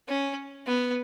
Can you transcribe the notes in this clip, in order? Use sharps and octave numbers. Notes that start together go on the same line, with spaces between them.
C#4
B3